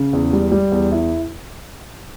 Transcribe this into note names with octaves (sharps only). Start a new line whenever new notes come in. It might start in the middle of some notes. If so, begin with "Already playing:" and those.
Already playing: C#3
E2
G3
G3
E2
E4